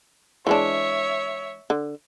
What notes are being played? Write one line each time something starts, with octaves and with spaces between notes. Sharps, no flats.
E3 G#3 D4 C#5 E5
D3